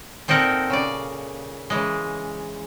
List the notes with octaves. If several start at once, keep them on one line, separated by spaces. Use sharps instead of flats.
A#2 C4 D#4 A4 A#4 F#5
C#3 D5
C#3 E3 G#3